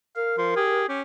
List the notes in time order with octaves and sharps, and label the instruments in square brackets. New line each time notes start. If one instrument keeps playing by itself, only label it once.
[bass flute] A#4 [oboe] F5
[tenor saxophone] F3 [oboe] C6
[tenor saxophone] G4 [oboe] G#4
[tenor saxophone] C#4 [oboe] G4